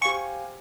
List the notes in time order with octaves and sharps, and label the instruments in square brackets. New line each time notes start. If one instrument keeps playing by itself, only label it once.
[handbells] G4 C5 F5 G#5 [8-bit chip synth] C#6